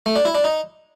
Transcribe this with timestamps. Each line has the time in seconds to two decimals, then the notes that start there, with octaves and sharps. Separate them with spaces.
0.06 A3
0.16 D4
0.25 E4
0.35 D4
0.44 D#4